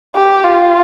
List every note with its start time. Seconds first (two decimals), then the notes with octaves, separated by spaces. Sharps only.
0.15 G4
0.44 F4